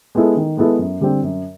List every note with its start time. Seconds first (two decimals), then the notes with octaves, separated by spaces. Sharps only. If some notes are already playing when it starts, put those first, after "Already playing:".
0.15 G#3 B3 E4 A4
0.37 D#3
0.57 G#3 B3 E4 A4
0.79 F#2
1.01 D3 G3 C4
1.23 F#2